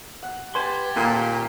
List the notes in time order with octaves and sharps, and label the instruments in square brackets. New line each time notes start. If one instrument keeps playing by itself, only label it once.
[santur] F#5
[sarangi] G4 [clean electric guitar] B4 C6 [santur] G#5 A5
[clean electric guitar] D#2 F4 [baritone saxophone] A#2 [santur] A3 A#3